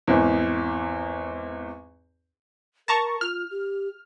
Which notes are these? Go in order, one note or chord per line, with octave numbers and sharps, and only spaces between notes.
G#1 E2
A#4 A5 A#5 C#6
F4 F6
G4